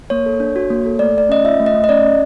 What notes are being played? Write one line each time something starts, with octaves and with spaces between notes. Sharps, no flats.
A#3 C#5
A4
D4
F#4
A#3
A4
A3 D5
A3 D5
C#4 D#5
F4 E5
A3
D#5
A3
D#5
C#4 D5
C#4